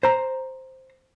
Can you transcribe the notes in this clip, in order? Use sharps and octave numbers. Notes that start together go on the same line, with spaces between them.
C5 A#5